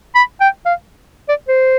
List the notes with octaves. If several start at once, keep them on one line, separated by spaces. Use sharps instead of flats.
B5
G5
F5
D5
C5